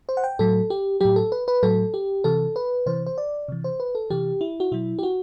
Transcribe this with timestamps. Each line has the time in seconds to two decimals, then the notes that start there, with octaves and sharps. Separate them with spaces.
0.09 C5
0.17 F#5
0.24 G5
0.39 A2 F#3 A4
0.70 G4
1.01 A2 F#3 G4
1.16 A4
1.32 B4
1.48 B4
1.63 A2 F#3 A4
1.94 G4
2.24 C3 E3 A4
2.56 B4
2.86 C3 E3 C5
3.06 C5
3.18 D5
3.48 C3 E3
3.64 C5
3.80 B4
3.95 A4
4.10 C3 E3 G4
4.41 E4
4.60 F#4
4.72 B2 F#3 E4
4.99 G4
5.03 F#4